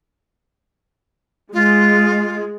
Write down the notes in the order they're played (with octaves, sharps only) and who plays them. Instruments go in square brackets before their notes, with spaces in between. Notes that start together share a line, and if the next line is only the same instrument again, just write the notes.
[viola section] G#3 [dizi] F4